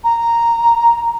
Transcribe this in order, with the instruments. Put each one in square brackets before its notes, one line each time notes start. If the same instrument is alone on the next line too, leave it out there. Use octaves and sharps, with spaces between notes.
[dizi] A#5